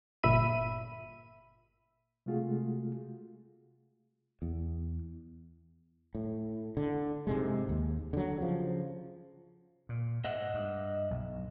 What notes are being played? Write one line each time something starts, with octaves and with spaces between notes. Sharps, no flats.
G1 A#2 E5 B5 D#7
C3 G#3 A3 F4 F#4 G#4
E2
A2
D3
G#2 C3 G#3
D#2
D3 F#3
C#3 F3
A#2
G#2 D#5 E5 F#5
G2
B1